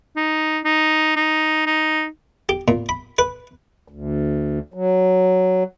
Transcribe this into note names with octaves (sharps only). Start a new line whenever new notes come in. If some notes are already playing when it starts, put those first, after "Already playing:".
D#4
D#4
D#4
D#4
G4
A#2
B5
B4
D2
F#3